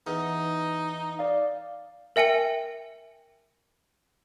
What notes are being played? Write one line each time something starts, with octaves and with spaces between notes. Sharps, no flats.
E2 D#4
D5 F5
A#4 E5 G5 G#5 C#7